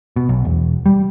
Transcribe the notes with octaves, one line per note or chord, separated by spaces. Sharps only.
B2
B1
E1
G3